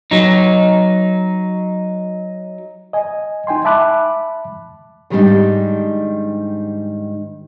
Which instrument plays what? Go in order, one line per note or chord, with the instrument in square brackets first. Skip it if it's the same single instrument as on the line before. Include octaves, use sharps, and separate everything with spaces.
[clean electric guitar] F#3 D#4
[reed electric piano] D#5 G#5
D#4 G5 G#5 C6
E5 A5 B5 D6 F#6
[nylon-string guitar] G#2 D#3 G3 B3 D4 D#4